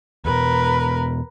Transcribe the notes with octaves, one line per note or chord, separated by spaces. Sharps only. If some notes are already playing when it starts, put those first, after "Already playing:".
E2 B2 A#4 B4